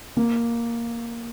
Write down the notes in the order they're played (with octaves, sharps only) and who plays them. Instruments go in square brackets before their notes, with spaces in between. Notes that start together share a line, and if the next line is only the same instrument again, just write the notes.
[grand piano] A#3